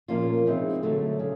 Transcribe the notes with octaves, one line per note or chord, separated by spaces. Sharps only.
A#2 F3 A#3 C#4 F4
C3 E3 G#3 C4 D#4
D3 F#3 A3
C#3